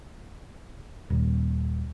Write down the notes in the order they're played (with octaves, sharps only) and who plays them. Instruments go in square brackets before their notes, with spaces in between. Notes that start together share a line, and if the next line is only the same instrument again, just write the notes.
[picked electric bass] D#1